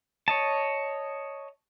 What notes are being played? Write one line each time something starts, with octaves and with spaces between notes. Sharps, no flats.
C#5 D#5 A5